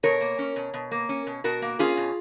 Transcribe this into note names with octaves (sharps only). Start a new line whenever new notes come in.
B2 A#4 C#5
A#3
C#4
B2
B2
A#3
C#4
B2
B2 F#4 A#4
A#3
C#4 F4 G#4
B2